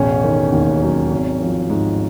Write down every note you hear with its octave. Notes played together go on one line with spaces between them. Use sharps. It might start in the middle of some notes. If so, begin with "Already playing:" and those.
Already playing: E1 A1 C#4
D#3
D#2
F#3
G#1
F3
G#2